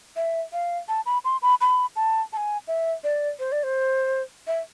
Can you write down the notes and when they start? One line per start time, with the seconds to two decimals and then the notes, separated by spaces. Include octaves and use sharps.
0.16 E5
0.53 F5
0.88 A5
1.06 B5
1.24 C6
1.42 B5
1.61 B5
1.96 A5
2.33 A5
2.37 G#5
2.67 E5
3.04 D5
3.39 C5
3.52 D5
3.63 C5
4.47 E5